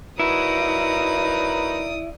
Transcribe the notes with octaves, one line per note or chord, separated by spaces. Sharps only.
F#3 D#4 E4 A#4 B4 D5 D#6